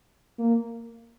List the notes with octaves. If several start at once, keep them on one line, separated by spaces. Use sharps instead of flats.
A#3